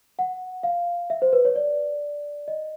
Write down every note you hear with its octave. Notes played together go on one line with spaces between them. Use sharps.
F#5
F5
E5
C5
B4
C#5
D5
D#5